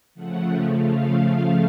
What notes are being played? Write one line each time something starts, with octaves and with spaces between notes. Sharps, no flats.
C#3 F3 A3 F#5
F5